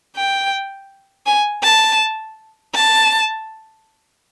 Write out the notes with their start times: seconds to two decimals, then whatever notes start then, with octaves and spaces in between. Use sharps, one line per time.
0.16 G5
1.26 G#5
1.63 A5
2.74 A5